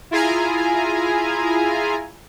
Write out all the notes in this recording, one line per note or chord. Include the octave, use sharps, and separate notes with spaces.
E4 F4 G#4 G#5 A#5